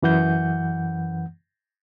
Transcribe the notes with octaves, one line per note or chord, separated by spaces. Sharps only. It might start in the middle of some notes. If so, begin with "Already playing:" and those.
F#2 E3 F#5 G6